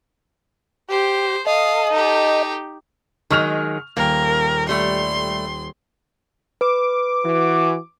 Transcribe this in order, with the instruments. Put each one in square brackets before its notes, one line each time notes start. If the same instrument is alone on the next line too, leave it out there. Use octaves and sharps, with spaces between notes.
[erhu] G4 [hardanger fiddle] C5
[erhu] A4 [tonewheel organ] D#5 [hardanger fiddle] F5 D#6
[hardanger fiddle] D#4 G4
[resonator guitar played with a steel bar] D#3 F#3 G#3 [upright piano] C#6 F6 F7
[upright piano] D#1 G5 [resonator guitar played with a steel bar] A#3 [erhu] A#4
[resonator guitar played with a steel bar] G3 A3 [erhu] C6
[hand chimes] B4 [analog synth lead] D6
[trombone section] E3 F#4